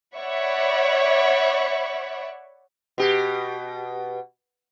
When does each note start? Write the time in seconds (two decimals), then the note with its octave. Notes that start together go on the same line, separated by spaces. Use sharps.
0.16 C#5 D5 E5 F#5 B5 C#6
2.98 B2 G4